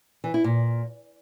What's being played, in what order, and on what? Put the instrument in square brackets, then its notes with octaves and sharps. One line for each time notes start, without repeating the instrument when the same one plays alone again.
[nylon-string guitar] E3
E4
A#2